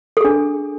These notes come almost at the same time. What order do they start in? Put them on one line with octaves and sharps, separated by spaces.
A4 G#4 D4